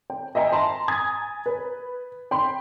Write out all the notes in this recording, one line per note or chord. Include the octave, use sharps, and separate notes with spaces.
G5
D#5 E5 G5 G#5 A#5
A5 A#5 C6
G#5 A#5 D#6 G#6 A6
B4
G5 B5 C6